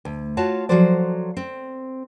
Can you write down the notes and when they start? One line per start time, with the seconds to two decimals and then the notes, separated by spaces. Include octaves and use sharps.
0.05 D2
0.37 F4 F#4 C#5 A5
0.69 F3 F#3 F#4 A4 C5 D5
1.37 C4